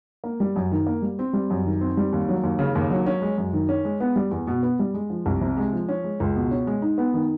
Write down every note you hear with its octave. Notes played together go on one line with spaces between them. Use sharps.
A#3
G3
F#2
D#3
A#3
G3
C4
G3
F#2
D#3
C4
G3
D#2
F#3
D#2
C#3
D#2
F#3
C#4
G#3
F#2
D#3
C#4
G#3
B3
G3
E2
B2
B3
G3
G#3
F3
C2
C3
G#3
F3
C#4
G#3
C#2
B2
C#4
G#3
D#4
B3
D#3